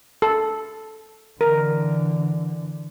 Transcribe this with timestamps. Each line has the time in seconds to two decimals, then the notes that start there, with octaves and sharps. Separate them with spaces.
0.22 A4
1.41 D3 E3 A#4